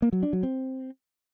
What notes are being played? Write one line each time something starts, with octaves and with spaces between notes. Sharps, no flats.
A#3
F#3
D4
F#3
C4